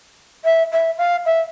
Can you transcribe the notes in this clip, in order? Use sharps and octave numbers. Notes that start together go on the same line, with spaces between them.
E5
E5
F5
E5